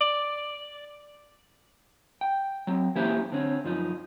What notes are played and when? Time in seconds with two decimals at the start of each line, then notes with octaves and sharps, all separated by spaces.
0.01 D5
2.21 G5
2.67 F#3 C4
2.95 E3 A#3 C#4 E4 G4 C5
3.32 D3 C4 C#4
3.64 F#2 F3 D#4